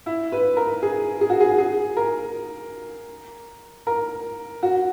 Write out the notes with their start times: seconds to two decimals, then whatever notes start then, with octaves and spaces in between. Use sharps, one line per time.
0.06 E4
0.32 B4
0.57 A#4
0.83 G#4
1.21 G#4
1.30 F#4
1.40 G#4
1.58 G#4
1.97 A#4
3.87 A#4
4.63 F#4